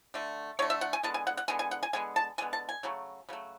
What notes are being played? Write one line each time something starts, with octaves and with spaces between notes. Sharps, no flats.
D3 A3
D3 A3 C#5
E5
F#5
G#5
D3 G#3 B3 A5
G#5
F#5
F#5
D3 G#3 B3 G#5
G#5
F#5
G#5
D3 G#3 B3 G#5
A5
D3 G#3 B3 G#5
A5
G#5
C#3 F#3 A3
C#3 F#3 A3